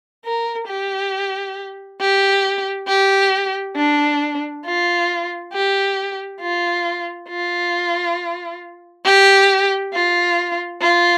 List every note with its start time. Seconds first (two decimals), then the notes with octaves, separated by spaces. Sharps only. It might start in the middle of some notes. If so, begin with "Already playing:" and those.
0.25 A#4
0.68 G4
2.00 G4
2.88 G4
3.76 D4
4.65 F4
5.53 G4
6.40 F4
7.29 F4
9.04 G4
9.93 F4
10.81 F4